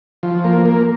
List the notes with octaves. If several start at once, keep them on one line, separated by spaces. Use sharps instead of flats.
F3
A#3
A#3